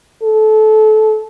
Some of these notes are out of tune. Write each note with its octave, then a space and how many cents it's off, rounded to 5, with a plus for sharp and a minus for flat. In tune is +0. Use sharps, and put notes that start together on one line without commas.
A4 -25